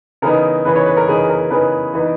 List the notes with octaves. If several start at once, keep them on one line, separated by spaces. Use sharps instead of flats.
C#3 E3 B3 D#4 A#4
C#3 E3 B3 D#4 B4
C#5
B4
A#4
C#3 E3 B3 D#4 G#4
A#4
C#3 E3 B3 D#4 B4
E3 B3 D#4